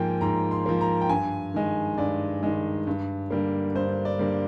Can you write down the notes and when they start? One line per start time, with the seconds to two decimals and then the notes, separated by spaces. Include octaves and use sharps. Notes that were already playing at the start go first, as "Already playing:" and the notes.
Already playing: G#2 F3 A#3 G5 G#5
0.21 G#2 A#5
0.51 C6
0.66 F3 A#3
0.81 A#5
1.01 G5
1.09 G2 G#5
1.54 D#3 G#3
1.98 G2 D5
2.43 D#3 G#3
2.87 G2
3.30 D3 G3 A#3
3.75 G2 C5
4.05 D5
4.19 D3 G3 A#3